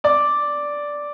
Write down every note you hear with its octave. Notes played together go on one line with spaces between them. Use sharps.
D5 D6